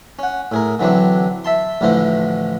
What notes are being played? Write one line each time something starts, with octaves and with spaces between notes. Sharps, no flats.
C#4 F#5
A2 G#4 A#4
D3 E3 F#3 C4 D4
E5 A5 C6
A1 A2 D3 E3 F3 C5